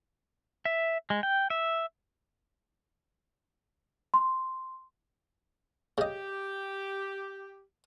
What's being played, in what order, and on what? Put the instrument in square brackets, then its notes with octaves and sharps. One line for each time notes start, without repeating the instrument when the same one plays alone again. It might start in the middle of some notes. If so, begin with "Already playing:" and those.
[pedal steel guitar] E5
G#3
G5
E5
[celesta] C6
[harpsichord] C#3 D#5 [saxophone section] G4